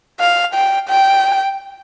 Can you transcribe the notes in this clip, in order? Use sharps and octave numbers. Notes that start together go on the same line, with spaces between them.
F5
G5
G5